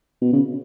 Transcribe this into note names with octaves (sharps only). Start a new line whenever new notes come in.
B2
C#3